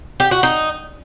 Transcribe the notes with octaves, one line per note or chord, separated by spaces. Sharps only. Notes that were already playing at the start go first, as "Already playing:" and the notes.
G4
F#4
D#4